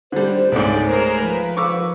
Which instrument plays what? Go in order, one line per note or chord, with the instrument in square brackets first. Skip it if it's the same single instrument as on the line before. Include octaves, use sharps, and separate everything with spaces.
[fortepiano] D3 G3 [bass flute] C5
[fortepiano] C#2 G#2 [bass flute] A3 [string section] D5
[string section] G#4 A#4 C5
[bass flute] F3 [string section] B4
[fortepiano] C#6 D6 E6